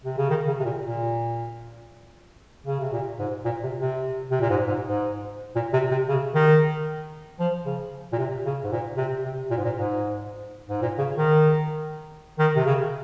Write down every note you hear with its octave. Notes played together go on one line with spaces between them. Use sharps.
C3
C#3
D#3
C#3
C3
A#2
A#2
C#3
C3
A#2
G#2
A#2
C3
C3
C3
A#2
G#2
G#2
G#2
A#2
C3
C3
C#3
D#3
F3
C#3
A#2
C3
C#3
G#2
A#2
C3
C3
A#2
G#2
A#2
G#2
G#2
A#2
C#3
D#3
D#3
C3
C#3